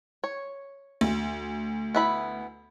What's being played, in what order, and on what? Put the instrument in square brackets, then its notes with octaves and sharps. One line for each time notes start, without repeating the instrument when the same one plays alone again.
[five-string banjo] C#5
[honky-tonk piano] D2
[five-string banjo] B3 E4 B5